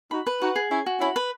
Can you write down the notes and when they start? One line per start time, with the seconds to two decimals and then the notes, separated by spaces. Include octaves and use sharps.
0.11 D#4 F#4 B5
0.27 B4
0.42 D#4 F#4 F#5
0.56 G#4
0.71 C#4 E4 G#5
0.86 F#4
1.01 C#4 E4 B5
1.16 B4